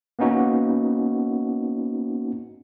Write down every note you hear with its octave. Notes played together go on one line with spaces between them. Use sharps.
A#3 B3 C#4 D#4 F#4